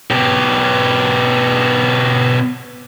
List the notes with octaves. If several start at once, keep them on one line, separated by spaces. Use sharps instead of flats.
B2 G4